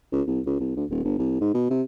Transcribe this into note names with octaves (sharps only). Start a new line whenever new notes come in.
C#2
C2
C#2
C2
D2
D#1
G1
C2
G#2
B2
C3